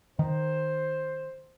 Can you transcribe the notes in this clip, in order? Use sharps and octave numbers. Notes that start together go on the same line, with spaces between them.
D#3 C5